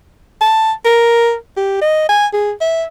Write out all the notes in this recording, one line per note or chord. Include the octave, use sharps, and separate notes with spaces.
A5
A#4
G4
D#5
G#5
G#4
E5